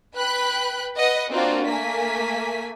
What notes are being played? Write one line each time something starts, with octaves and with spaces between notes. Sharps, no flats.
B4 G5 B5 F#6
B4 D#5 F#5
A#3 C4 D4 F4 F#4
A3 A#3 G#5 B6